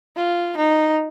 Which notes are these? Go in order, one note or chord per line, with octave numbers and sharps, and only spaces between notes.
F4
D#4